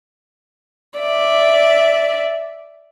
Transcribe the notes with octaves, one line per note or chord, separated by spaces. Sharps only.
D5 E5